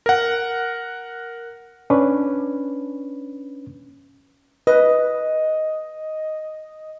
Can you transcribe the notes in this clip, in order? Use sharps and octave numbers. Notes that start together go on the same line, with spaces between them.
A#4 F#5
C#4 D4 B4
B4 D#5